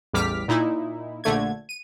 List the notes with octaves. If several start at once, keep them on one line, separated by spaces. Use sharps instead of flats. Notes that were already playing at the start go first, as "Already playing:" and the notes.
A1 E2 G3 D6 F6 B6
A#2 D#4 E4
A#1 D3 A3 G#6
D#7